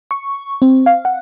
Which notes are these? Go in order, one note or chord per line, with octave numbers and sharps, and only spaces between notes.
C#6
C4
F5
F#5